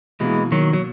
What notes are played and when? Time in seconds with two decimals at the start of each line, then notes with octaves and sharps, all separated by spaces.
0.20 B2 E3 G#3 A#3 E4
0.52 D#3 F#3
0.73 F#3